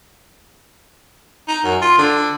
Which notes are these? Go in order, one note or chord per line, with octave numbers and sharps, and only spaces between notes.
D#4
F#2
F4
D3